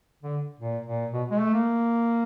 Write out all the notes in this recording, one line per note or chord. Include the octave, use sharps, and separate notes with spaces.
D3
A#2
A#2
B2
G#3
A3
A#3